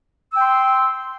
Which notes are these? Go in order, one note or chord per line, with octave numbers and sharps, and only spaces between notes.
G5 C6 E6